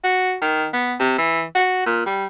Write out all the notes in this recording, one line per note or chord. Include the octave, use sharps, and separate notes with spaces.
F#4
D#3
B3
C3
E3
F#4
A#2
G3